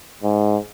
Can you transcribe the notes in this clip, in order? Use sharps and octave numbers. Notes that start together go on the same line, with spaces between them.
G#2